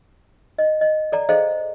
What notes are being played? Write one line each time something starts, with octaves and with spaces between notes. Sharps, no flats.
D#5
D#5
A4 D5 A#5
G#4 A4 C5 D#5 F5